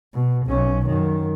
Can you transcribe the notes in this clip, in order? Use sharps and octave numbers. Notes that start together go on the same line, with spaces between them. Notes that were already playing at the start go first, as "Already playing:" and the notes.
B2
B1 C#4
F#2 D#3